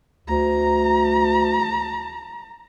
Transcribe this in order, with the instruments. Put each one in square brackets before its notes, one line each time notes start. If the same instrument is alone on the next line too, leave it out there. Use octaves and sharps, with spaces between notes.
[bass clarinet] D2 [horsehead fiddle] A#5